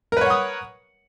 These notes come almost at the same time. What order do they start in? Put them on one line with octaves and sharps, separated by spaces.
A#4 B4 C#5 F#5 D#6